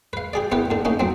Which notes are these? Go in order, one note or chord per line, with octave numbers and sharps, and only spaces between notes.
B4 F5
G4 G#4 D5
B3 E4 G4 A#4 B4
D#2 D3
A3 A#3 C#4 D#4
F#3 C4